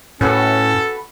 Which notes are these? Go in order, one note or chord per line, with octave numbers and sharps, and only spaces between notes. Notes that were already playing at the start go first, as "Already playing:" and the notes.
A2 C#4 F#4 A4 B4 F#5